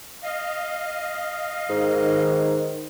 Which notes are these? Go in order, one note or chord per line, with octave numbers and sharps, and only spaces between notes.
D#5 F5
G#2 D#3